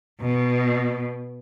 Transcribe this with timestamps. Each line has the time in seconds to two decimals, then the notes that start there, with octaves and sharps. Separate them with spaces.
0.21 B2